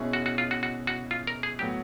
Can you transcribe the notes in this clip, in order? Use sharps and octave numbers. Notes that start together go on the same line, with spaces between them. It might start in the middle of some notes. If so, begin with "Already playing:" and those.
Already playing: B2 G#3 C#4 E4 G#4
F#4
F#4
F4
F#4
F#4
F#4
F4
A#4
G#4
A2 F#3 B3 G4